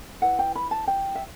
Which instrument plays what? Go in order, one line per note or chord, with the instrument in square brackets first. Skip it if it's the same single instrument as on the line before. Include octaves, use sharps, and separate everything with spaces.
[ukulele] E4 B4 F#5
G5
B5
A5
G5
E5